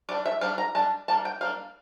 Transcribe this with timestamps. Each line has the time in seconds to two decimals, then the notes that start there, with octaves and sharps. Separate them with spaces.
0.09 G3 D5
0.12 D4
0.26 E5
0.41 G3 D4 F5
0.58 A#5
0.75 G3 D4 A5
1.08 G3 A#3 D4 A5
1.25 G5
1.41 G3 A#3 D4 F5